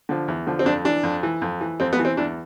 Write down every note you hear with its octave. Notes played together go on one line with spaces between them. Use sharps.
D3 F3
E2
D3 F3
C4
F2 D4
E3 D4
F2
E3
F2
E3
F2 C4
B3
E3
C4
E2 D4